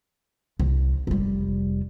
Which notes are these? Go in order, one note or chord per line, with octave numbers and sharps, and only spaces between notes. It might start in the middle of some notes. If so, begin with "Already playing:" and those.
C2
F1 G3